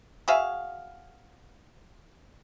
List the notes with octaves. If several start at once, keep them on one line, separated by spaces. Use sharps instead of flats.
F#4 G#4 E5 F5